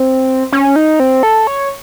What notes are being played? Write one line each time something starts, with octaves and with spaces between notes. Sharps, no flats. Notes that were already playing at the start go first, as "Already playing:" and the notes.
Already playing: C4
C#4
D#4
C4
A4
C#5